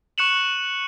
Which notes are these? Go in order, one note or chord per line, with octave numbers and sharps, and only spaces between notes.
C#6 F#6 C#7 E7 F#7